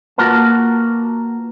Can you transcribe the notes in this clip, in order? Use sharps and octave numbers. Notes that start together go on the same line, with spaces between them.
A#3 F4 F#4 A#4 B4 A5